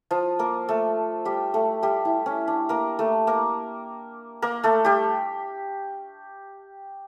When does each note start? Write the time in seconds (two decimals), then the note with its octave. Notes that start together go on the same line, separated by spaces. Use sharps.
0.11 F3 F4
0.39 A#3 A#4
0.69 A3 A4
1.25 G3 G4
1.54 A3 A4
1.83 G3 G4
2.05 E4
2.26 C#4
2.48 D4
2.69 A#3 A#4
2.99 A3 A4
3.27 A#3 A#4
4.42 A#3 A#4
4.63 A3 A4
4.85 G3 G4